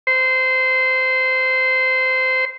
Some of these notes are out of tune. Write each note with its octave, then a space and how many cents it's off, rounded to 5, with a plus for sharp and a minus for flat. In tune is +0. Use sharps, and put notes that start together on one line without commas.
C5 -15